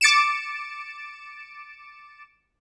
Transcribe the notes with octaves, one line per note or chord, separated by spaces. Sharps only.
D6 A6 C#7 D7 E7